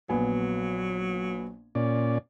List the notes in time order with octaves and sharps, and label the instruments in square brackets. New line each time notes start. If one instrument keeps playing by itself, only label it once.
[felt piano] A#1 B3 G#5 [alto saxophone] F#3
[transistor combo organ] A#2 C#4 D5